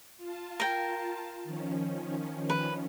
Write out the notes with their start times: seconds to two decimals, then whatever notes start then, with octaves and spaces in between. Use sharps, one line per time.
0.18 F4 A5
0.60 A#4 G5
1.44 D#3 F3 C#4
2.49 B4